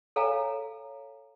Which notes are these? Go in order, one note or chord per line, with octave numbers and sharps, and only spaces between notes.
A4 C#5 F5 G#5 A#5